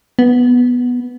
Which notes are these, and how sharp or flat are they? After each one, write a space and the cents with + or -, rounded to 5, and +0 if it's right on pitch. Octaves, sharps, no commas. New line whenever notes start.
B3 -5